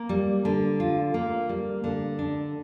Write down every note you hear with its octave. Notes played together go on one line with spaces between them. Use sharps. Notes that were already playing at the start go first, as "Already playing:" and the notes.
Already playing: A#3
G3
D3
F4
A#3
G3
D3
D4